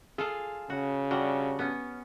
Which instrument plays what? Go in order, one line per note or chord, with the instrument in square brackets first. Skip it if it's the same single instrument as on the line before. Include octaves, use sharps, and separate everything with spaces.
[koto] F4 A4 F5 [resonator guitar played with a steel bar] G#4
[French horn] C#3 [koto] F#4
[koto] G3 [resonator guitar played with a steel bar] D4 F#4
[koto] B3 C#4